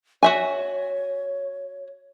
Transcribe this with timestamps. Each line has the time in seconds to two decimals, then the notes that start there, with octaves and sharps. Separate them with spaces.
0.23 F#4 C#5 E5 G#5